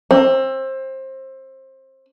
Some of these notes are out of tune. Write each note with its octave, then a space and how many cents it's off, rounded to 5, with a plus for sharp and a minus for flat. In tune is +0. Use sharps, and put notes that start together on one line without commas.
C4 +25